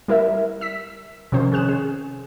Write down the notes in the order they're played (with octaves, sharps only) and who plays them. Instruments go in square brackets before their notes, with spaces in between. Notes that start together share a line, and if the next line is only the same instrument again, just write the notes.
[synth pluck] G3 E4 A#4 E5
E6 B6
C3 D#3 F3 C#4 C5
C#4 G#4 F#6 E7
G#4